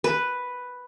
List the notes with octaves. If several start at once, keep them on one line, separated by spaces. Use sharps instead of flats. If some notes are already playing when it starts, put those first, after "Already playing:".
B4